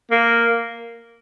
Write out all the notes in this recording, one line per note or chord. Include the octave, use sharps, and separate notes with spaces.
A#3